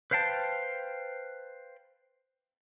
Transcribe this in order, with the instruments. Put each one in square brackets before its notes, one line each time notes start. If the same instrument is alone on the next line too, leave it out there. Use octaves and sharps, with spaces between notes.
[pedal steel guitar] B4 C5 F5 G5 A5